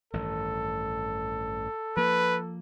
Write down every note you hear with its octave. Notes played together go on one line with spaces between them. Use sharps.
A1 G2 D#3 A4
F3 A#3 B4